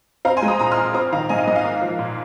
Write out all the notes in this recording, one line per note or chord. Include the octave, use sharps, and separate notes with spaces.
C4 F5 A#5
G#5 C6
G#3
A#5 D#6
A#2 A#5 D#6
C6 F6
A#2
C4 A#5 D#6
D#3 F5 A#5
G#2 D#5 G#5
F5
G#2 D#5
F5
A#3
F3
A#2